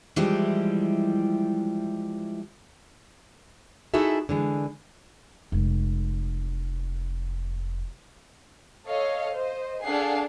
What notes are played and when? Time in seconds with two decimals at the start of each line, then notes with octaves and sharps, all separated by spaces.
0.16 E3 F3 G3 G#3 E4 G4
3.94 D#4 E4 F#4 G#4 A4 E5
4.29 D3 E3 G#3
5.52 F1 G#3
8.86 A4 C#5 D#5 F5
9.35 C5 D#5
9.83 D4 G#4 A4 F5 F#5 C7